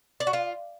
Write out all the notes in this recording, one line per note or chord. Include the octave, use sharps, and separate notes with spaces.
D5
F#4
F4